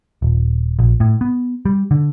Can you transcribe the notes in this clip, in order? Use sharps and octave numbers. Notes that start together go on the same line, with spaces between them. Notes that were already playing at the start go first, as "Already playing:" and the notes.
D#1
A#1
A2
B3
G3
D3